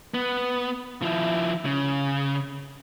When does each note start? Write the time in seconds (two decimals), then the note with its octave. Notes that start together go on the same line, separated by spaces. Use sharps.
0.14 B3
1.02 F3 E4
1.65 C#3